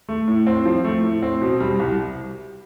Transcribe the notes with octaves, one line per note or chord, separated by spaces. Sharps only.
A3
A2
C4
F3
A3
A2
C4
B2
G3
C2